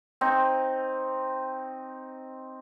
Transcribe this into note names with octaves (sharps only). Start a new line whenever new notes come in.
C4 D#4